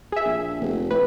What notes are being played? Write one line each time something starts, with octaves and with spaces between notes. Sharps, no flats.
G#4 E5
A#1
F1
A2 B4